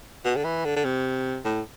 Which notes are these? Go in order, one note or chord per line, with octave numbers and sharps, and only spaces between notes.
B2
D3
E3
D3
D3
C3
A2